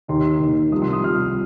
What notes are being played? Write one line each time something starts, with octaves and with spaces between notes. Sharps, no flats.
D#2 D#3 A#3 D#4 C6
D#2 D#3 A#3 D#4
C2 C3 F3 D#6
C6
D#6
C2 C3 F3 F6